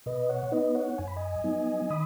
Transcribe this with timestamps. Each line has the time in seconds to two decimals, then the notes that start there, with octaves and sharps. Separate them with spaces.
0.06 B2 B4 D#5
0.29 C#5 F#5
0.52 B3 D#4 B4 D#5
0.75 C#5 F#5
0.98 F#2 G#5
1.08 B5
1.16 D#5 G#5
1.44 F#3 B3 D#4
1.90 D#3 B5 D#6